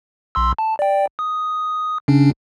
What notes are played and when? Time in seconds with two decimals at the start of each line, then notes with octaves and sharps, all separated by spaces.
0.35 B1 C6 E6
0.59 A5
0.79 D5 G5
1.19 D#6
2.08 C#3 C#4 D4